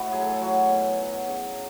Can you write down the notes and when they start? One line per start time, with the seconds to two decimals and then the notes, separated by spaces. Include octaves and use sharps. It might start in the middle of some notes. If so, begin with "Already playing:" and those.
Already playing: A2 E4 F#4
0.12 F#3 G#4
0.22 A4
0.31 G#4
0.41 F#3 F#4
0.70 B2
0.98 F#3
1.27 C#3